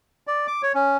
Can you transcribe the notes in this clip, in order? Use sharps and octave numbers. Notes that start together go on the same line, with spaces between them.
D5
D6
C#5
C#4